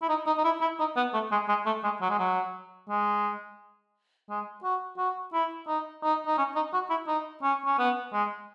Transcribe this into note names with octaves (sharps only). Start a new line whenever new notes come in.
E4
D#4
D#4
D#4
E4
E4
D#4
B3
A3
G#3
G#3
A3
G#3
F#3
G#3
F#3
G#3
G#3
F#4
F#4
E4
D#4
D#4
D#4
C#4
D#4
F#4
E4
D#4
C#4
C#4
B3
G#3